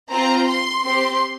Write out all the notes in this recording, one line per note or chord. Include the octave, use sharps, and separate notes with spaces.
C4 F4 A#5
C6
C4 G4 C6